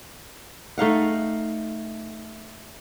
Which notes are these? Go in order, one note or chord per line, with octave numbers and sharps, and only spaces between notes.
A3 D#4 F5 F#5